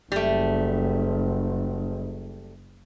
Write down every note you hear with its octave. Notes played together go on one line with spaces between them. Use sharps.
F#1 G3 A3